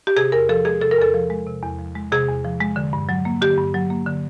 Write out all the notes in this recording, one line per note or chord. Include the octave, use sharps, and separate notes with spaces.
G4
C3 G#4
E2 A#4
F3 A4
G#3 G#4
C3 A4
A#4
E2 A4
F3
G#3
C3
E2
F3
G#3
C3 G#4
E2
F3
G#3
D3
G2
F#3
A#3
D3 G4
G2
F#3
A#3
D3